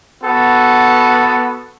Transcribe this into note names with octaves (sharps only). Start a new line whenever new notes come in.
B3 F#4 A4